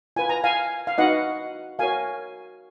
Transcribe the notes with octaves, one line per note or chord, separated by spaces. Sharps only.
F4 B4 G#5
A#5
F5 G#5
F5
D#4 F#4 B4 D#5 F#5
F#4 A#4 C#5 F5 G#5